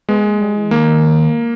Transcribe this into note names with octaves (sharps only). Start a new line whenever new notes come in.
G#3 B3
A#3
G3
E3
D#3 A#3